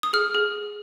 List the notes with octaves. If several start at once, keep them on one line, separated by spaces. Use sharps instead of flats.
D#6
G#4 F6
G#4